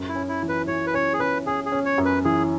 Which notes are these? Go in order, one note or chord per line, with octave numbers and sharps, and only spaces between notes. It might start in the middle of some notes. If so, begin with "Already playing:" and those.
Already playing: F#2
E4
C#4
E4
E3
B4
E3 C#5
B4
C#4 C#5
G#4
C#4 B4
C#4 G#4
G#4
C#4
C#5
F#2
B4
E3 G#4